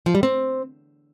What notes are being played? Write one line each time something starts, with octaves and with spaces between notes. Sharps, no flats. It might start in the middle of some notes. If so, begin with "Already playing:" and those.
F3
G3
C4